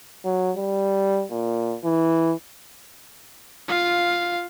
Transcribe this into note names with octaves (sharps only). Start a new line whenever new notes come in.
F#3
G3
A#2
E3
F4 F5